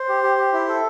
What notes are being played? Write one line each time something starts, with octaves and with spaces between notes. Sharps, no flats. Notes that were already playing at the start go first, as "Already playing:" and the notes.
Already playing: C5
G4
G4
G4
E4
A4